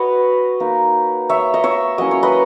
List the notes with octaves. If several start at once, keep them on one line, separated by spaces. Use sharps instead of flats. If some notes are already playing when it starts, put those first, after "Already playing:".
Already playing: F#4 B4 C#5 D#5
A#3 D#4
C#5 E5
D#5
C#5 E5
F#3 A#3 C#4 E4 D#5
C#5
B4 D#5